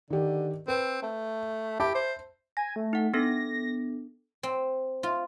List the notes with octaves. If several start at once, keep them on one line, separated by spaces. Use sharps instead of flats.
D3 D#3 G4
C4 B4
A3
G4 E5 A5 B5
C5
G#5 A#6
A3
D#4 F#5
B3 D4 A4 A#6
C4
F4